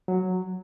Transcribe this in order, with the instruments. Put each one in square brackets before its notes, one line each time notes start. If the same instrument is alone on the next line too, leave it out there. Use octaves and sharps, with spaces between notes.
[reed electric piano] F#3